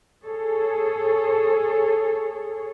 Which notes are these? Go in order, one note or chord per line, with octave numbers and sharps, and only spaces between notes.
G#4 A4 C#5